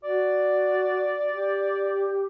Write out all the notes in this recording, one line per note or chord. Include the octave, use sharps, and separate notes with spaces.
F#4 D5
G4